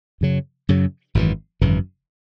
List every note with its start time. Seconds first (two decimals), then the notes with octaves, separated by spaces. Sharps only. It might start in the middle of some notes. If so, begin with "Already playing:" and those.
0.21 F#2 C#3 F#3
0.69 F#2 C#3 F#3
1.15 G#1 F#2 C#3 E3
1.61 G#1 F#2 C#3 E3